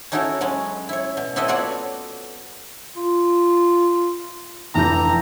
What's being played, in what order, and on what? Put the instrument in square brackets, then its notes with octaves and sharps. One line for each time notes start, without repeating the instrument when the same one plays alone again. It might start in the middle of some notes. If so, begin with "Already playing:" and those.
[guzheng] C#4 D#4 E4 F#4 A4 A#4
F#3 G#3 C#4
E4 C#5
B2
B3 C4 E4 A4 C#5 D#5
F4 F#4 A4 C#5 D5 F#5
[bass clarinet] F4
[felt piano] F1 E3 G6 [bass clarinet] D4 [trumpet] A#5